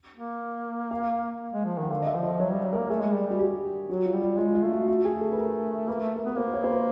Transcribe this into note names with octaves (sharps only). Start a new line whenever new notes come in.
A#3
F5
G#3
F3
D#3 F#5
D3 F5
D#5
E5
F3
D#5
F#3 C#5
G3
F#3
A#3 A#4
A3 G#4
G#3
G3
G3 F#4
G4
F#3 F#4
F4
G3
F4
G#3 F4
F4
A3
F#4
A3 F#4
G#4
A4
B4
A#4
A#3 B4
A3
A#4
B3 B4
A#3 C5
C#5
C5
B4